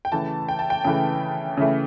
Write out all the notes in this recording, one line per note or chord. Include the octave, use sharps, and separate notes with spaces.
G5
C#3 E3 A3 A5
G5
A5
G5
C#3 E3 A3 G5
C#3 E3 A3